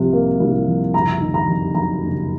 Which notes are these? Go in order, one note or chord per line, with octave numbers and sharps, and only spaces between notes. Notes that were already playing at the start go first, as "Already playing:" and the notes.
Already playing: C2 C3 F3
A#3
C2
F3
F#1 A#5
D#3
A#5
F2
F#3 A#5
F#1